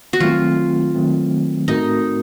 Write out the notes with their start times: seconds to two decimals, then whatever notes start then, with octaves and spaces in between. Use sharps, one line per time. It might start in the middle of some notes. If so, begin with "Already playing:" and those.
0.13 F#4
0.20 D#3 F#3 A3 C4 F4
0.95 D#3 F#3 A3 C4
1.68 A2 A3 C4 D#4 F#4 A#4